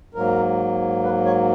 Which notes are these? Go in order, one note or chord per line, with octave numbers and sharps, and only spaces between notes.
G#2 F#3 A#3 A#4
B4
C#5